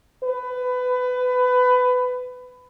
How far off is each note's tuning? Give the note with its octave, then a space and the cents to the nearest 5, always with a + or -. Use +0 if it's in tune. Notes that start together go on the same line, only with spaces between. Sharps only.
B4 +20